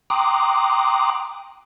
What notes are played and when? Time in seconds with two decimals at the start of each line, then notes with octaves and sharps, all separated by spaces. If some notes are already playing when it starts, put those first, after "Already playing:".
0.10 G5 A#5 C6 D6 D#6 F#6